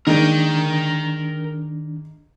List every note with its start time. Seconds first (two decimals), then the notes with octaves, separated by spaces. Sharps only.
0.07 D#3 G#3 A#3 D4 D#4 A#4 G5